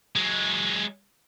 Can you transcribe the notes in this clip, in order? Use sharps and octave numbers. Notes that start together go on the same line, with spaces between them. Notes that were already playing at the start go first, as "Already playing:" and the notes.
F#3 G#3